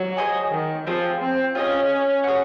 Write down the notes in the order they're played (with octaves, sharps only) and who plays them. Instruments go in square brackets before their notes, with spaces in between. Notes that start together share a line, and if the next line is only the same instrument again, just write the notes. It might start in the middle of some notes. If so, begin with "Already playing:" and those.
Already playing: [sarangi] F#3
[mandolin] G#4 C5 D#5 G#5
[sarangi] D#3
[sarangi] F3 [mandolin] C4 F4 G#4
[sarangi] C4
[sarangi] C#4 [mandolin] F4 G#4 D#5
[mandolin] G#4 C#5 F#5